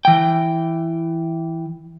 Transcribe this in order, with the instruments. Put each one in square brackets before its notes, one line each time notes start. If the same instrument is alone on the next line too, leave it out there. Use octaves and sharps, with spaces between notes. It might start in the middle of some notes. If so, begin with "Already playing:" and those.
[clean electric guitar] E3 G5